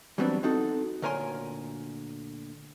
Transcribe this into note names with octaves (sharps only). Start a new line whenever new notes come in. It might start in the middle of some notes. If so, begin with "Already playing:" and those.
E3 F#3 G3 B3 C4 D4
C4 D#4 F#4 A4
D2 A#2 A#4 C#5 G#5 C6